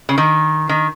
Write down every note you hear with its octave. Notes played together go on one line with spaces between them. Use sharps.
C#3
D#3
D#3